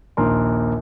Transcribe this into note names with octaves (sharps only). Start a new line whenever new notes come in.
A#1 D#2 A#4 C6